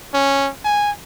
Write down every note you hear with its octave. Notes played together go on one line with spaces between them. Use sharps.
C#4
G#5